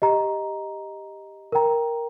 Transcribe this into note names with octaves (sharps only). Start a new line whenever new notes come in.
G4 D#5 A#5
A#4 G5 A#5